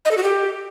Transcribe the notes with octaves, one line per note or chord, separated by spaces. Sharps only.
D#5
A4
F#4
G4